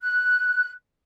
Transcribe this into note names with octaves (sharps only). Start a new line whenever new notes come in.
F#6